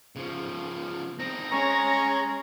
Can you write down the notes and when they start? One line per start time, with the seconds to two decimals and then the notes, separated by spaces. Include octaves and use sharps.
0.16 C#3 F3
1.19 C4 D#4 A#6
1.52 G#3 C#4 C#5 A#5